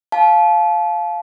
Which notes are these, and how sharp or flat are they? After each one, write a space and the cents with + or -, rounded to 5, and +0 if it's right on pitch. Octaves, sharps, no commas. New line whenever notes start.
F5 +0 A5 -30